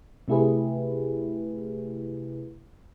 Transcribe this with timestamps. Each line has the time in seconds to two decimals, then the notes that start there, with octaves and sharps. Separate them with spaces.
0.28 C3 A3 E4 G4 G#4 B4